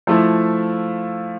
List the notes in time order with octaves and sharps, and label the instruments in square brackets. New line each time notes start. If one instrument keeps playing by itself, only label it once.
[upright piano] F3 A3 E4